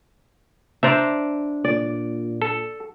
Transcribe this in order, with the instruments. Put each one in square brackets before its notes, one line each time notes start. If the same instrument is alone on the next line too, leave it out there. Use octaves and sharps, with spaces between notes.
[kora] D4 C5 D5 [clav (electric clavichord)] E5 A#5
[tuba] A#2 [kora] D5
[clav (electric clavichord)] A4